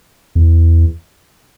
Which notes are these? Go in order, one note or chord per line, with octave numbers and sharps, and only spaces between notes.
E2